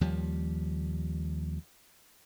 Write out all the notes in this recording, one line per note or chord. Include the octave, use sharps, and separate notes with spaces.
D#2 F3 G3